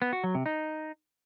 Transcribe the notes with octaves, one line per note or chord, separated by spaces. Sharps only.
B3
F#4
F#3
C3
D#4